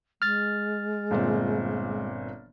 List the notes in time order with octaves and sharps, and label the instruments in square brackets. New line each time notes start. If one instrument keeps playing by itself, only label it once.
[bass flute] G#3 [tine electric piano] F6 A6
[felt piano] G1 A#2 C4